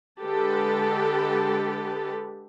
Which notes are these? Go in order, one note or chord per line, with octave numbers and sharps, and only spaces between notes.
D3 G#3 G4 A4 B4 A5